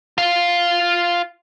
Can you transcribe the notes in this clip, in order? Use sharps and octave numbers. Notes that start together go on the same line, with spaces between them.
F4 F5